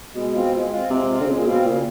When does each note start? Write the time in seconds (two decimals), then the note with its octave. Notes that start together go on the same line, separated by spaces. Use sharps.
0.14 B2 G#3
0.33 C4 F4
0.53 G#3
0.71 C4 F4
0.89 C3 G#3
1.09 C4 F4
1.21 D3
1.27 C#3 G#3
1.38 A#2
1.46 B2 C4 F4
1.64 A#2 C#3